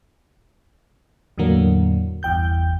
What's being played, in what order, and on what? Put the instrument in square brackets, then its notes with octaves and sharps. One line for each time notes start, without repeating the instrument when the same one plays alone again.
[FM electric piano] E2 A2 D3 F#3 A#3
G1 E2 G5 G6